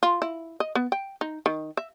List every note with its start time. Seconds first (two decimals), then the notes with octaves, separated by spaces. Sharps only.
0.03 F4
0.22 E4
0.60 D#5
0.75 B3
0.92 G5
1.21 D#4
1.46 D#3
1.77 E5